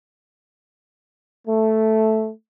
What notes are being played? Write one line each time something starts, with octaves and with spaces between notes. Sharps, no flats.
A3